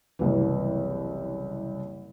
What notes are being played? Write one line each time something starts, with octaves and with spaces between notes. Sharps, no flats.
F#1 C2 E3